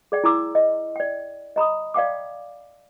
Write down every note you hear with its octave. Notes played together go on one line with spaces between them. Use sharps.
G#4 D5 G5
E4 G#5 A#5 D6 E6
D#5
D5 G5
D#5 A#5 B5 D#6
D5 F5 G5 D6